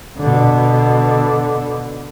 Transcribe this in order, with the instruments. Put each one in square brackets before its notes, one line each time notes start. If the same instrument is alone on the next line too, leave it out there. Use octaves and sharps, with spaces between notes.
[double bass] B2 D3